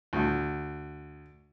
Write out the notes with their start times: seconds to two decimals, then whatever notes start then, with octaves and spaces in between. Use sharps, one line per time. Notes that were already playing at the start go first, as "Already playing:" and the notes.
0.13 D2